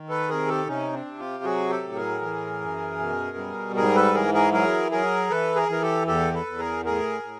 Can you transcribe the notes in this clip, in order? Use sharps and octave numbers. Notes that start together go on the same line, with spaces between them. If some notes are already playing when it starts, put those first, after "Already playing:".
Already playing: D#3
A4 B4
C3 G#4 A#4
G4 A4
C3 C#4 D#4
C4 D4
C3
F4 G4
F#3 F#4 G#4
G4 A4
A2
G#4 A#4
E3
F#2
B2
G3
G#2 G#4 A#4
A4 B4
E3 G#4 A#4
G#4 A#4
F#3 G#4 A#4
F#3 G#4 A#4
E3 A4 B4
G#4 A#4
E3 A#4
G4 A4
E2 G4 A4
A4 B4
E2
G#4 A#4
A2 G#4 A#4
A2